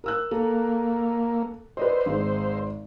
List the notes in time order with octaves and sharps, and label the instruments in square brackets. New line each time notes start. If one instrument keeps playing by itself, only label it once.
[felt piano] A#4 E6 F#6
[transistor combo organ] A#3 [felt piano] A4
[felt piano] B4 D5 D#5 [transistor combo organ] C5
[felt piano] G#1 G#3